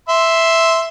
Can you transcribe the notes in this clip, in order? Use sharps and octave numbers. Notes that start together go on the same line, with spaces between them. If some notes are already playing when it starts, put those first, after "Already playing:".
E5 C6